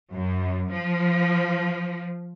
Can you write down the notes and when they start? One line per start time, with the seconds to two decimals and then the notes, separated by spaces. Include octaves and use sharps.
0.14 F#2
0.70 F3